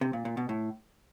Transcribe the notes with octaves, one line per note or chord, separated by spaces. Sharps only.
C3
A#2
A#2
B2
A2